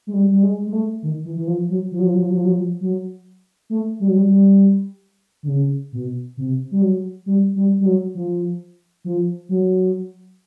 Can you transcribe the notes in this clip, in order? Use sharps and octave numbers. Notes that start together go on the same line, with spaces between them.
G#3
G3
G3
G#3
G#3
A3
D#3
E3
E3
F3
F#3
F3
F#3
F3
F#3
F3
F#3
F3
F#3
F3
F#3
A3
G3
F#3
G3
G3
D3
C#3
B2
C3
G3
F#3
G3
G3
G3
F#3
F3
F3
F#3